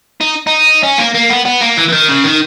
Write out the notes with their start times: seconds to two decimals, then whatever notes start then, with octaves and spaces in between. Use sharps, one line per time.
0.21 D#4
0.47 D#4
0.83 C#4
0.98 A#3
1.15 A#3
1.30 B3
1.46 B3
1.61 A#3
1.77 E3
1.89 E3
1.93 D#3
2.09 C#3
2.24 D#3